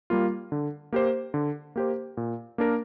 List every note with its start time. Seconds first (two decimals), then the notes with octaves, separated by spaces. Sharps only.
0.10 G3 A#3 F4
0.52 D3
0.93 A#3 G4 C5
1.34 D3
1.76 A#3 G4 C5
2.17 A#2
2.58 A#3 D4 A#4